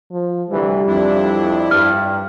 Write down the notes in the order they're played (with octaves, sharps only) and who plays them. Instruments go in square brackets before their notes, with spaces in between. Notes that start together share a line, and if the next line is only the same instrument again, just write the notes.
[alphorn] F3
[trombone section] D2 C3 E3 [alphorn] G3
[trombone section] F2 [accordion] D4 E4
[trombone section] G2 [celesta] F6